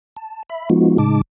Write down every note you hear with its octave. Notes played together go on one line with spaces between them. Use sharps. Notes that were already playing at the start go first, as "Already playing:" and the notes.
A5
E5 B5
F3 G#3 B3 D#4 F4 F#4
A2 C#3 G#3 D#4 A5 D6